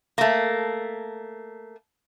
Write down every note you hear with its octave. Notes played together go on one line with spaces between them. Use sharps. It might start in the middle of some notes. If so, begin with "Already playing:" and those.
A3 A#3